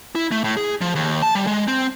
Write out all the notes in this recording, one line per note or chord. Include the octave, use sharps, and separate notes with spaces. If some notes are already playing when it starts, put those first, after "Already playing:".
E4
A3
A2
G#4
F3
D#2
A5
G3
G#3
C4